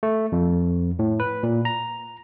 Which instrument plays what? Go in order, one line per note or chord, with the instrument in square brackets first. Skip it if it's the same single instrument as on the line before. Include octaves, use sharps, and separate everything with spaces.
[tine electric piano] A3
F2
A2
B4
A#2
A#5